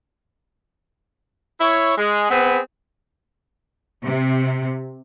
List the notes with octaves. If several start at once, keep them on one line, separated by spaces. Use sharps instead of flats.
E4 C#5
G#3
B3 C4 G#4 B4
C3